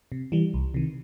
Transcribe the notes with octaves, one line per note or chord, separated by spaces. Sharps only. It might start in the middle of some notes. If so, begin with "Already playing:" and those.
C3
E3 G3
C2
C3 D#3